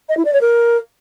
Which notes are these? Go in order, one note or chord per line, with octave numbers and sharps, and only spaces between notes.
D#5
E4
D5
C#5
A#4